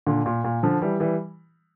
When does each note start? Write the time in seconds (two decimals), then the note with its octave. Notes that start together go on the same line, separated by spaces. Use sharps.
0.07 A#2 D3
0.26 A#2
0.44 A#2
0.63 D3 F3
0.82 E3 G3
1.00 E3 G3